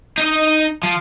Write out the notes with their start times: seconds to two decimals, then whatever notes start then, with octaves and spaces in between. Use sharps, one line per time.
0.18 D#4 D#5
0.83 F3